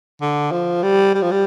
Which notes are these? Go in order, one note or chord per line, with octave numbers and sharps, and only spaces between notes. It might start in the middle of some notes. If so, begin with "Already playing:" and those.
D3
F3
G3
G3
F3
G3